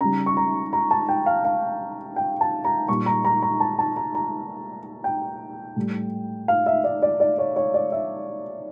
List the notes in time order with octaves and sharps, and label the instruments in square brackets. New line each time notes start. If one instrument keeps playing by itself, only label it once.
[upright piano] C#3 G3 A#5
C#6
A#5
A#5
A5
G5
F5
F5
G5
A5
A#5
A#2 G3 C#6
A#5
A#5
A#5
A5
A5
A#5
A#5
G5
A2 G3
F5
E5
D5
D5
D5
C#5
C#5
D5
E5